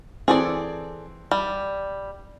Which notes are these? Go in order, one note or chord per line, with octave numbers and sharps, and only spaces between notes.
E3 C4 G#4 A4 D5
G3